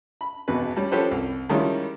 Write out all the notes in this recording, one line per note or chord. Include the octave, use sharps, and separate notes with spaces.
B5
G#1 E2 B2 B4
G3 C#4
F3 C#4 G4 A4 B4 C5
C2
D#3 G3 G#3 C#4 E4 F4